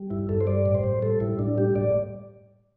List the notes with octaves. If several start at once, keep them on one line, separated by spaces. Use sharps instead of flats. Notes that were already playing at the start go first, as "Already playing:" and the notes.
Already playing: G3
G2 E4
G2 A4
C5
G3 D5
A2
C5
A2
G3 A4
A2 E4
A2 D4
G3 G4
A2 D5